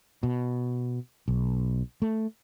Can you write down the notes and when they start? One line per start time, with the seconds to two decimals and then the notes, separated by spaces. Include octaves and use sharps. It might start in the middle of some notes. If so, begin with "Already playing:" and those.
0.23 B2
1.28 B1
2.02 A3